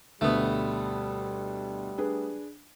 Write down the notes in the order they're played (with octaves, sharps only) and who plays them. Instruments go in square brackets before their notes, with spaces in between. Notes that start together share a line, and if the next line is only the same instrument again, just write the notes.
[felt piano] D2 B2 [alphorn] G3 [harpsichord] A3 B3
[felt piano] D4 G#4 B4